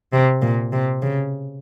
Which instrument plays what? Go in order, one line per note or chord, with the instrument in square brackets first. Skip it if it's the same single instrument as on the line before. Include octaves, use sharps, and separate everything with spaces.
[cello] C3
A#2
C3
C#3